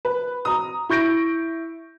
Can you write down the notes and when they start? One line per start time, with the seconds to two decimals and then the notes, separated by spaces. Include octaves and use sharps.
0.05 B4
0.45 A#5 D#6
0.89 E4 C#6 G6 A#6 D7